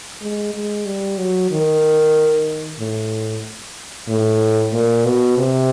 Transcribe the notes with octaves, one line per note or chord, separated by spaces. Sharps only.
G#3
G#3
G3
F#3
D#3
A2
A2
A#2
B2
C3